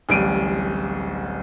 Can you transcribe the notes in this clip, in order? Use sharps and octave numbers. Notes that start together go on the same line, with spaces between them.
D1 A1 G3 D7 D#7